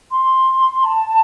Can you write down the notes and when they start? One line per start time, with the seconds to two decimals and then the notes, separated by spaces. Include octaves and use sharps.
0.11 C6
0.83 A5